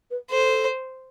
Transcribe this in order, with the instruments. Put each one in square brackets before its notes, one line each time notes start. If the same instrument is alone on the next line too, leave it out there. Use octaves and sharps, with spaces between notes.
[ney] B4
[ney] A4 [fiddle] C5